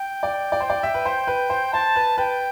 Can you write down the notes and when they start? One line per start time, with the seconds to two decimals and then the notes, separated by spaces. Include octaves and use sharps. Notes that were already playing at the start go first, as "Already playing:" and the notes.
Already playing: G5
0.23 D5
0.52 D5
0.60 C5
0.70 D5
0.83 E5
0.94 B4
1.06 C5
1.27 B4
1.50 C5
1.73 C5 A5
1.96 B4
2.18 B4 G5